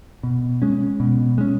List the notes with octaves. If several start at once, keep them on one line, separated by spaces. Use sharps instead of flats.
B2
G#3 C#4
B2
G#3 C#4